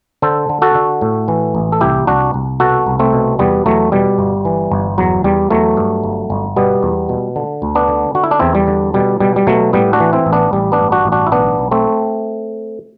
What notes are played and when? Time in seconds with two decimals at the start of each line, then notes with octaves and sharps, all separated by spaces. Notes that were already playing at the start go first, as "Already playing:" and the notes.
0.22 D3 A4 C5
0.49 D3
0.62 F#4 A4
0.75 D3
1.01 A2
1.28 E3
1.55 A1
1.72 A4
1.81 C2 E4 G4
2.07 C2 D4 F#4
2.34 C2
2.60 B2 F#4 A4
2.86 C2
2.99 A3 C4
3.13 B2
3.39 E2 G3 B3
3.66 E2 F#3 A3
3.92 B2 G3
4.18 G1
4.45 E3
4.71 G1
4.98 E2 F#3
5.24 E2 G3
5.50 E2 F#3 A3
5.77 G2
6.04 G1
6.30 G1
6.56 B2 G3 B3
6.83 E2
7.09 B2
7.36 D3
7.62 D2
7.75 B3 D4
7.88 D3
8.15 D3 F#4
8.24 E4
8.31 D4
8.39 E2 C4 E4
8.55 G3
8.68 D3
8.94 B2 G3
9.20 B2 G3
9.36 G3
9.47 B2 F#3 A3
9.73 A2 G3 B3
9.93 D4 F#4
10.00 E3
10.13 C4 E4
10.26 A1
10.33 B3 D4
10.53 A1 G3
10.72 B3 D4
10.79 G2
10.92 D4 F#4
11.05 A1
11.12 D4 F#4
11.27 E4
11.32 B1 B3 D4
11.58 B1
11.71 A3 C4